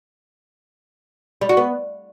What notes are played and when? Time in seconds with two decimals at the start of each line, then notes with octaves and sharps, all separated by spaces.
1.41 G3
1.49 F#4
1.57 B3